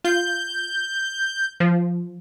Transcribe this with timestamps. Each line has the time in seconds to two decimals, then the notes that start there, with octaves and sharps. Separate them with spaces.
0.04 F4 G6
1.60 F3